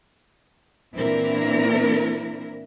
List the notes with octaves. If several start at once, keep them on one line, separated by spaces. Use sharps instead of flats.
A#2 E3 C4 D4 E4 A#4